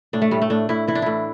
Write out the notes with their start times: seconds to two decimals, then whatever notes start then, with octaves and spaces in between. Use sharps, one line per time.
0.13 A2 D4
0.22 A3
0.31 A2 G3
0.42 A3
0.50 A2 D4
0.69 A2 E4
0.88 E3 E4
0.95 D4
1.02 A2 E4